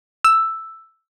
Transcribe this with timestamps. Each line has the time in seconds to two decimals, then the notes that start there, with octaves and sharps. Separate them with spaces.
0.25 E6